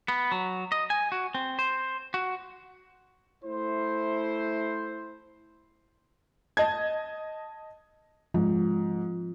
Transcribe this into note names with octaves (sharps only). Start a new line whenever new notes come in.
B3
F#3
D#5
G#5
F#4
C4
C5
F#4
A3 E4 C5
D#5 A5 G#6
G#2 F3